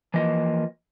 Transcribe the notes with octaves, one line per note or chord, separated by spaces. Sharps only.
E3 F3 A#3 D#5